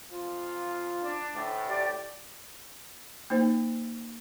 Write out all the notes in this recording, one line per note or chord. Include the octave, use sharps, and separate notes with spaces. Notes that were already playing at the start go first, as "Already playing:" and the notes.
F2 F4
D4
D2 A2
G4 D5
A#3 D#4 C5